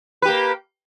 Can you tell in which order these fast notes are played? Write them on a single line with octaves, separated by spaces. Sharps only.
B4 G4 A#3